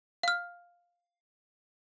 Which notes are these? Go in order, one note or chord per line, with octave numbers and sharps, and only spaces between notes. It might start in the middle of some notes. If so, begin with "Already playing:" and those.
F5 F6